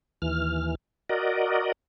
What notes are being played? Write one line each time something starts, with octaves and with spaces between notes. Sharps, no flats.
D#2 E3 F6
F#4 A#4 D5 D#5